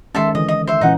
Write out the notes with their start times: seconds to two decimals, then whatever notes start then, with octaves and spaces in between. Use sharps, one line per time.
0.15 D#3 G#3 C#4 A4 E5 C6
0.35 D3 E3 D#5
0.48 D#5
0.67 C5 E5
0.81 A#2 E3 C#4 D#4 F#5